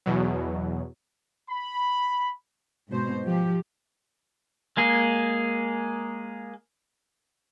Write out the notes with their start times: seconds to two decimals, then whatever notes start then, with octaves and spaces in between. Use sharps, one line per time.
0.06 E2 B2 F#3
1.50 B5
2.89 G#2 B2 C5
3.23 F3 G4
4.77 G#3 A#3 G#4